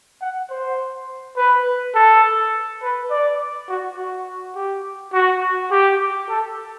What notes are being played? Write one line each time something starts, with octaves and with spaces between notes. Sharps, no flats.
F#5
C5
B4
A4
B4
D5
F#4
F#4
G4
F#4
G4
A4